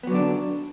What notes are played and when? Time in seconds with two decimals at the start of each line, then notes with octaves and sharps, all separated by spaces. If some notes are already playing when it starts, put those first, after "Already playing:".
0.03 B3
0.07 F#3
0.11 D3
0.15 D4